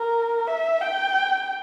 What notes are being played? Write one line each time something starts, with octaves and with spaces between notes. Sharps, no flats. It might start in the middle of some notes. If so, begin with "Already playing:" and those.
Already playing: A#4
E5
G5